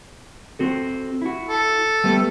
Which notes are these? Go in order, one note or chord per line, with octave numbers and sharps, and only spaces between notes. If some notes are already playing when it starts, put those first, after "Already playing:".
C4 F#4 A4
E4 F#4
A4
G3 A3 B3